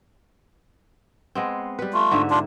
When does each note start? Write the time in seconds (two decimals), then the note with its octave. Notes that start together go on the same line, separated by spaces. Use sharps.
1.35 G#3 B3 C4
1.79 G3 B4
1.93 A3 F4
2.11 G#2 D3 E5
2.30 D4 F4